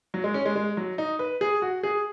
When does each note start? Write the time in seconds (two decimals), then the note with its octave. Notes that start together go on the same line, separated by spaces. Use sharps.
0.14 F#3
0.24 G#3
0.34 C#4
0.45 G#3
0.56 G#3
0.77 F#3
0.98 D#4
1.19 B4
1.41 G#4
1.62 F#4
1.83 G#4